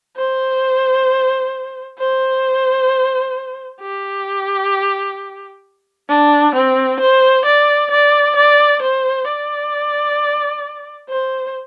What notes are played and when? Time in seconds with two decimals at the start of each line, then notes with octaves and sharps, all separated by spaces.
0.17 C5
1.99 C5
3.80 G4
6.09 D4
6.54 C4
7.00 C5
7.45 D5
7.91 D5
8.36 D5
8.82 C5
9.28 D5
11.09 C5